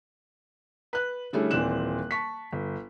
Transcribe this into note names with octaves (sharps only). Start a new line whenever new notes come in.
B4 F#6
D3 G3 A3 C#4 E4 G#4
D#1 E3 C4 D5 F#6 E7
A5 C#6 B6
G1